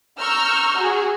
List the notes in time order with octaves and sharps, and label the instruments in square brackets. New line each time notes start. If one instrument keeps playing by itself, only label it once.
[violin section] A#5 C#6 E6 F6 G6
F#4 G#4